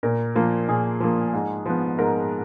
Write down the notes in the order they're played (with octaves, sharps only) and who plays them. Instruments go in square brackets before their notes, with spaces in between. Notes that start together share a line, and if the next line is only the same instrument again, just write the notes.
[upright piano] A#2 A#4
F3 A#3
A#2 G#4
F3 A#3
G#2
F3 B3
G#2 A#4